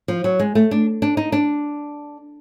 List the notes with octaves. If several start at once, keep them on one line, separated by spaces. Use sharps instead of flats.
F3
F#3
G#3
A3
D4
D4
D#4
D4